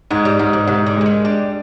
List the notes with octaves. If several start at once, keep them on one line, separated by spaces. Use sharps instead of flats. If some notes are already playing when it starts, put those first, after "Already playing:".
G#2 G#3
G3
G#2 F3
D3
G#2 C3
D3
D3 G#3
D#3
G3 D4